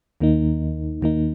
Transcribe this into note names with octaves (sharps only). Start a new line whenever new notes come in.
D#2 D#3 A#3 D#4
D#2 D#3 A#3 D#4